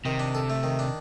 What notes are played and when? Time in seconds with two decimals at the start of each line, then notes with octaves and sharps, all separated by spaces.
0.05 C3 D#3
0.20 D4
0.35 A4
0.50 A3
0.63 D#3
0.79 D4